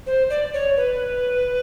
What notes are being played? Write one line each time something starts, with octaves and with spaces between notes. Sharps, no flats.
C5
D5
C#5
B4